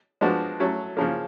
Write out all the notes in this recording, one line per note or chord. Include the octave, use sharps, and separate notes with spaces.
F3 G#3 B3 D4 F#4
F#3 A3 C#4
C#3 F3 A#3